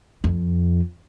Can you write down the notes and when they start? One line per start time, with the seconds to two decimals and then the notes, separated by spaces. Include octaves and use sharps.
0.24 F2